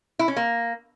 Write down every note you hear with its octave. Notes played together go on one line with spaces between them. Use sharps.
E4
C#4
A#3